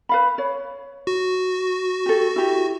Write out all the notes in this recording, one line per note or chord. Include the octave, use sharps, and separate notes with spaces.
B4 F5 B5
C#5
F#4
G4 A4
E4 G4